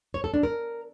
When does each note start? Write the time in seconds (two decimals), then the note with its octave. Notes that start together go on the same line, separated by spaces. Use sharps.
0.14 C#5
0.24 A4
0.34 D4
0.43 A#4